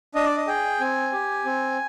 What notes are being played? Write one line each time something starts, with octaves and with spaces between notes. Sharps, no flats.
D4 D#5
D5
D#5
G#4 G5
C4 G#5
G4
C4